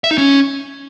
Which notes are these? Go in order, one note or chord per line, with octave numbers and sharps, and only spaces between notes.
E5
D#4
C#4